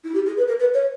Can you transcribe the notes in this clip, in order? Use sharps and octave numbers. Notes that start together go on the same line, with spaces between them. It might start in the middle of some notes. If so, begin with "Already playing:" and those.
E4
G4
G#4
B4
A#4
B4
C#5